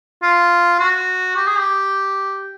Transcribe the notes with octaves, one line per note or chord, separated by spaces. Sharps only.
F4
F#4
G4
G#4
G4